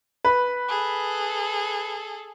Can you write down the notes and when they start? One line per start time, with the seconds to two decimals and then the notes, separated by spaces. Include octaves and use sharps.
0.25 B4
0.68 G#4 A4